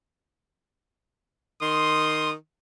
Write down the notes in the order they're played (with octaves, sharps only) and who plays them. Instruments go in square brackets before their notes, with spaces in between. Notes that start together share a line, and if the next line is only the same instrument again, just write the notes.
[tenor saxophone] D#3 [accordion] C6 [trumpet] D#6